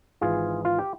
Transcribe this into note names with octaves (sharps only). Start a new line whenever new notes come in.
G#1 G#2 E3 F4 G#4
F4
G4